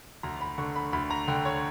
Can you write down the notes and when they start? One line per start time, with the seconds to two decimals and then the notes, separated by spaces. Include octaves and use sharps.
0.23 D2 A#5
0.41 B5
0.58 D3 C#6
0.76 B5
0.93 D2 B5
1.10 A#5
1.28 D3 G5
1.45 C#5